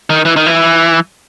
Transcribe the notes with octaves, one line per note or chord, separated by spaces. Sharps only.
D#3
E3
D#3
E3